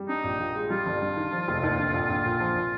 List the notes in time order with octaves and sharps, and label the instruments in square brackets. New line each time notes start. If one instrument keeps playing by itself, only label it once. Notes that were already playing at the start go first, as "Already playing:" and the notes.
Already playing: [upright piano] G3
[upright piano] D4 [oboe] D#4
[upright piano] A#1
A#2
G#3
[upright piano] G3 [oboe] F4
[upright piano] G1
G2
D#3
F3
F1
D#2
D3
A#1
A#1
A#2
F3
A#2